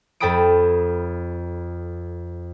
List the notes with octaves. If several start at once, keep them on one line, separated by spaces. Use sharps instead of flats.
F2 A4 G5 B5 D#6 D7